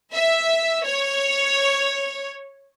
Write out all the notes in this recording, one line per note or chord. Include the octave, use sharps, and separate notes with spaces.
E5
C#5